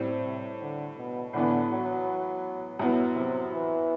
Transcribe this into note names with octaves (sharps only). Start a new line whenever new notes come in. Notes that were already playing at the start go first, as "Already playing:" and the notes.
Already playing: A2 G3 C4
C3
D3
B2
A2 D3 E3 B3
F#3
F#2 F#3 B3 E4
C3
E3